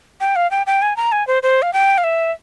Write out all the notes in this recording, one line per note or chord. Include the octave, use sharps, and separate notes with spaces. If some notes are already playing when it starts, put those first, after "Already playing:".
G5
F5
G5
G5
G#5
A#5
G#5
C5
C5
F5
G5
F5
E5